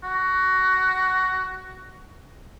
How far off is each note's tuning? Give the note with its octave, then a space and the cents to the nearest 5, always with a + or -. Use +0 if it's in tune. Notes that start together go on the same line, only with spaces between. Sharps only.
F#4 +15